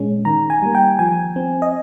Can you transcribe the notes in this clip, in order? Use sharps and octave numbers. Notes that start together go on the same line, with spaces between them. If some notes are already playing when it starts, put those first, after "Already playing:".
Already playing: A#2 G#3 C#4
D#3 A#5
G#5
G3 A#3
G5
F3 G#5
C4
D#5